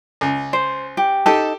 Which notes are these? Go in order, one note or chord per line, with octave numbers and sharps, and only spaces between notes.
C#2
C5
G4
D#4 G4 A4